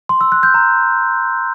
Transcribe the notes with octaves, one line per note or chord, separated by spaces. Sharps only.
C6
E6
F#6
G6
A#5